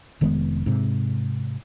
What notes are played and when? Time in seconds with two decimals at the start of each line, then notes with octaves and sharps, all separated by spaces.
0.21 F1 D#3 G#3 B3
0.66 G#2 C3